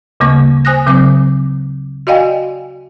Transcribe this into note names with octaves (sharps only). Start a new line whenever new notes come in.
D2 C#3 G3 A#3 C#6
C5 G#5 D#6 F#6 A#6
C#3 F#3 C4 D6
F#4 D5 D#5 F5 G5 G#5